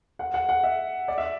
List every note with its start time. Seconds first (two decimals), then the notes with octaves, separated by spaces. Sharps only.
0.19 F#5
0.34 F#5
0.49 F#5
0.63 E5
1.08 D5
1.18 E5